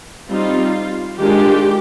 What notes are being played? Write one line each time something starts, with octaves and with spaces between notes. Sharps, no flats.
G3 C4 D#4 F4
D#3 G#3 D4 F4 G4